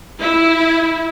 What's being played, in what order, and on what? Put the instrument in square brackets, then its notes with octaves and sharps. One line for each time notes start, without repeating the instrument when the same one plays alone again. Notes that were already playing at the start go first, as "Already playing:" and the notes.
[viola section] E4